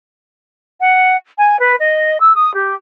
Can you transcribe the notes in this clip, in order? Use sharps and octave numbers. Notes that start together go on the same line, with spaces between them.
F#5
G#5
B4
D#5
E6
D#6
G4